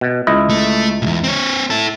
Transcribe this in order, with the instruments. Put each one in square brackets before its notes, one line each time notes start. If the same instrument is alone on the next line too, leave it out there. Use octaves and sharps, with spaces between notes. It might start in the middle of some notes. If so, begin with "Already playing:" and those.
[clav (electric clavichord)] B2
C#2 E4 D#5
[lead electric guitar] A3
B1 E2
C4 C#5
E4 A4